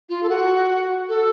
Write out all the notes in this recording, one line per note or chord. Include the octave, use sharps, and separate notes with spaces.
F4
A4
F#4
A4